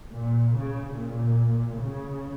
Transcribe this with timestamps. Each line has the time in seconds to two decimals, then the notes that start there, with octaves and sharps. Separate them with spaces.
0.14 A#2
0.56 C#3
0.97 A#2
1.80 C#3